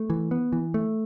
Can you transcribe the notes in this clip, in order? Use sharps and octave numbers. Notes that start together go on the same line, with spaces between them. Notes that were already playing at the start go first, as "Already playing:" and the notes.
Already playing: A3
E3
B3
E3
A3